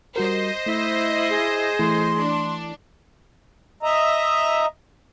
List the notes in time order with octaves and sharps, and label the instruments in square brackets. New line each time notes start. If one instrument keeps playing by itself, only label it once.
[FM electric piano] G3 F#4 A#4 [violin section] C5 D#5
[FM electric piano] A3 B6 [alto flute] E4
[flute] G#4
[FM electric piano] E3 A3 E4 [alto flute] C6
[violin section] D4
[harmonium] D#5 E5 A#5